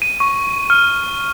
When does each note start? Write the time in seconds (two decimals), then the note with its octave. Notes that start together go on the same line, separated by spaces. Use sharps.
0.02 D#7
0.20 C#6
0.70 F6